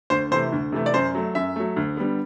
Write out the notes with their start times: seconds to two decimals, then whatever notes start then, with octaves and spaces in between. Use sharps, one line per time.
0.10 D2 C5
0.31 C3 E3 A3 C5
0.52 D2
0.72 C3 E3 A3
0.86 D5
0.94 F#2 C5
1.15 F#3 A3
1.35 F#2 E5
1.56 F#3 A3
1.76 D2
1.97 D3 G3 B3